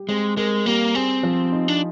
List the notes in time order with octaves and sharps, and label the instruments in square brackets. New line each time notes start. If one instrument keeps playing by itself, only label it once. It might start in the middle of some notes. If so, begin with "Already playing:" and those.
Already playing: [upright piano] G3 G4
[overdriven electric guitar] G#3 [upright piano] C4
[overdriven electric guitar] G#3 [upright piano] A#4
[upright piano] G3 [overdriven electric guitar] A#3
[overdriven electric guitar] C4 [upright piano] G#4
[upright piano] F3
D#4
[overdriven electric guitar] D4